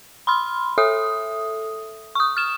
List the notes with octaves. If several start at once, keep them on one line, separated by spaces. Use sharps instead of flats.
B5 C6 F6
A4 E5 D#6
C#6 D#6
F6 E7